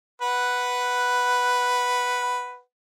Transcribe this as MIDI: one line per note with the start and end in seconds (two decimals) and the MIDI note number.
0.22 2.60 71
0.22 2.60 78